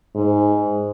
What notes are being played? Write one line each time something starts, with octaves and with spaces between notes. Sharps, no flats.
G#2